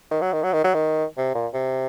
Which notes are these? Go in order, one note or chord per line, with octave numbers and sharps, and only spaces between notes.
D#3
F#3
D#3
F#3
D#3
F#3
D#3
C3
A#2
C3